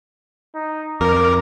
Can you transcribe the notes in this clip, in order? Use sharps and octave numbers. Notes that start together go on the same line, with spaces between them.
D#4
F2 A#4 D6